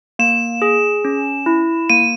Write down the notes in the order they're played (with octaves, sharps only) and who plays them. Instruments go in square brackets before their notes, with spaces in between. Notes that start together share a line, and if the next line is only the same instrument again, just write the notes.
[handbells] A#3 [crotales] E7
[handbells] G#4
C#4
E4
[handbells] A#3 [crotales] D#7